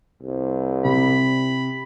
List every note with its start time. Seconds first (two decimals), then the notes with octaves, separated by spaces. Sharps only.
0.23 C2
0.84 C3 B5